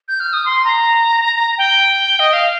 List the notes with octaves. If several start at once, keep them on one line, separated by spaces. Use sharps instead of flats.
G6
F6
D#6
C6
A#5
G5
D#5
F5